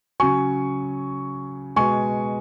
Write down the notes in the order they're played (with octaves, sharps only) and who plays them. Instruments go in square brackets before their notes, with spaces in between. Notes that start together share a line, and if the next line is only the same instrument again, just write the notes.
[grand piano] C#3 F#3 G#5 C#6
B2 G#3 G#5 C#6